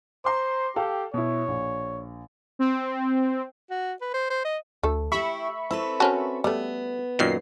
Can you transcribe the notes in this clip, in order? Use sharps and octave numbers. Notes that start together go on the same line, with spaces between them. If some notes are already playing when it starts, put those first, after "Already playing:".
C5 A#5 C6 D6
G4 A4 F5 G5
B2 E4 C#5
A#1
C4
F#4
B4
C5
C5
D#5
D2 A3 A4
E4 G4 E5 B5 C#6
C4 E4 A4 B4
C#4 F#4 A#4 C5 A5
G3 A3 B3
F#2 A#2 D#3 C7